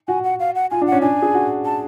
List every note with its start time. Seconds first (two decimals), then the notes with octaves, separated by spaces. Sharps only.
0.08 F#4 G#5
0.24 F#5
0.40 F5
0.55 F#5
0.71 F4 G#5
0.81 D4
0.87 F#5
0.92 C#4
1.02 D4 G#5
1.22 G#4
1.34 F#4
1.65 A5